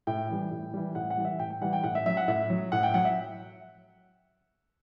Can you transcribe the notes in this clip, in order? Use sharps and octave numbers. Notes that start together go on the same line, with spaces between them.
A2 G5
E3 G3
A2
E3 G3
A2 F#5
F#5
E3 G3
E5
A2 G5
G5
E3 G3 F#5
G5
A2 F#5
E5
F#3 E5
F#5
A2 E5
F#3
A2 F#5
G5
F#3 F#5
E5